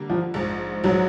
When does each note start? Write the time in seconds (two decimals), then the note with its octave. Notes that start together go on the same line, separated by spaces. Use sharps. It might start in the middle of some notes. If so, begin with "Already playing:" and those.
Already playing: D3 G3 A#3
0.10 F3
0.34 A#1 G#2 F3
0.84 A#1 G#2 F3 F#3